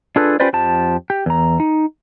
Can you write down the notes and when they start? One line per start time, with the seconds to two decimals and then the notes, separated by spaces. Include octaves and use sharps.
0.16 D4 F4 G#4 A4 B4
0.40 C#4 F4 G4 B4 C5 D5
0.53 F2 F3 G4 A5
1.10 G4
1.26 E2 A#5
1.60 D#4